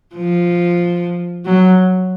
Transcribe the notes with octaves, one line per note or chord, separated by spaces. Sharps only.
F3
F#3